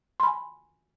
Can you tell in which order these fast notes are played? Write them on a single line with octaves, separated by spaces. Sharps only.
C6 B5 G#5